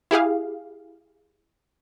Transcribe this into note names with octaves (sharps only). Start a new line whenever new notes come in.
E4 G4 G#4 F5